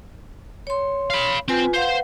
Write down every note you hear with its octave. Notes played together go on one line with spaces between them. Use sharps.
C#5 C6
F5 B5
C4 F4 B4 G#5
B4 C5 F5 F#5